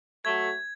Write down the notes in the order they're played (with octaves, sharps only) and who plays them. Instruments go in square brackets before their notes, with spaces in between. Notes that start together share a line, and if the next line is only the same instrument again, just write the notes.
[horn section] F#3 A3 [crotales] G#6